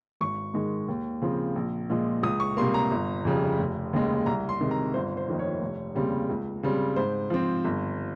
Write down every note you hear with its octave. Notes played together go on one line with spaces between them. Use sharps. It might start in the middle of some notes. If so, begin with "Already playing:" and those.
G#1 C#6
G#2 D#3 G#3
D#2
C#3 F3 C4
A#1
A#2 F3 G#3
C#2 D#6
C#6
C3 G3 A#3 C6
A#5
G1
F2 C#3 G3
F1
D#2 C#3 G#3
C2 A#5
C6
C3 D#3 G#3 C4
A#5
G1 C5
C5
F2 D#3 A#3
C#5
F1
D#2 C#3 G3 C4
C#2
C#3 G3 C4
G#2 C5
F3 C4
G1